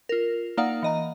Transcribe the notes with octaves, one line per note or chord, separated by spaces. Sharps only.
F4 A#4
A#3 D#4 D5 F5 F#5
E3 D#5 A#5